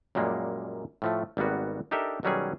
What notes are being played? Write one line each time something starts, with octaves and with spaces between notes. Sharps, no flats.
F#2 A#2 G3 G#3 A#3
A2 F3 A3
G#1 G3 A#3 B3 F#4
D4 D#4 G4 A4 A#4 E5
B1 D#3 F#3 G3 C#4 G#4